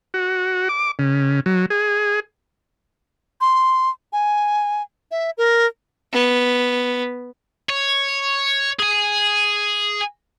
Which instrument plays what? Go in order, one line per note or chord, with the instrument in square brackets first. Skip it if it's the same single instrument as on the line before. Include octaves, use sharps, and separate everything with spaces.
[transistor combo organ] F#4
D6
C#3
F#3
G#4
[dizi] C6
G#5
E5
A#4
[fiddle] B3
[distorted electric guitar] C#5
G#4 G#5